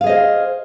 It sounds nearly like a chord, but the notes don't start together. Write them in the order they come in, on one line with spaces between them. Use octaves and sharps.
F5 G#4 D#5 C5